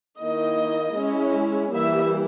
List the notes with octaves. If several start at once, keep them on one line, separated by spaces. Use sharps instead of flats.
D#3 A#3 E4 D#5
G#3 C#4 E4
E3 G3 A#3 E4 E5